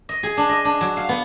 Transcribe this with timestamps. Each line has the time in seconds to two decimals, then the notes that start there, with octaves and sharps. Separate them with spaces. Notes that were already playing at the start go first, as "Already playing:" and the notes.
0.09 D#5
0.23 G#4
0.37 D4
0.49 D#5
0.65 D4
0.81 F#3
0.97 F5
1.09 B3